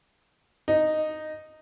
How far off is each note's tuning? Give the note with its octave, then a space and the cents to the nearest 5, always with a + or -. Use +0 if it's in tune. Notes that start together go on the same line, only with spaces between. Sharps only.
D#4 -5